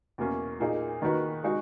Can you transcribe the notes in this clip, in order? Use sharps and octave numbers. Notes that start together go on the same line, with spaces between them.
E2 B2 A#3 C#4
A#2 A#3 D#4 G#4
D#3 A#3 D#4 F#4 B4
G#3 D#4 F#4